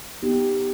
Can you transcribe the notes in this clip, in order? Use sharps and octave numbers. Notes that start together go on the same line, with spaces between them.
B3 D#4 G4